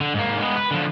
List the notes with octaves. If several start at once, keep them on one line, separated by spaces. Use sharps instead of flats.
D3
G#2 A#3
G#3 B3
B4
D3 F3